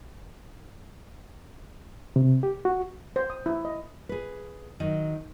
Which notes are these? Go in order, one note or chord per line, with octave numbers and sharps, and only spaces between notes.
C3
G4
F#4
C5
D#6
E4
D#5
G#4 B4
D#3 F#3